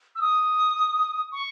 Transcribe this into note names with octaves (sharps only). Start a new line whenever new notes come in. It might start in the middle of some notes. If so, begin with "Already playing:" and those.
E6
D#6
C#6